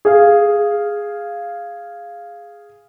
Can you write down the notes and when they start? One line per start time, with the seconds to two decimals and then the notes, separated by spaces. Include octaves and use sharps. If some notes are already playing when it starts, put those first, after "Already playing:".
0.05 G#4 F5